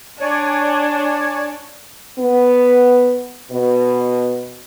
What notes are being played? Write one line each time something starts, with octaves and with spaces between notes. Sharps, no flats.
D4 C#5 D5 G#5
B3
B2